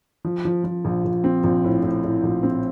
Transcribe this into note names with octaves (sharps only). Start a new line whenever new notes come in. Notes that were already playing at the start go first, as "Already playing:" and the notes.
F3
F3
F3
A#1
A#1
C4
A#1
A2
A2
A2
A#1
C4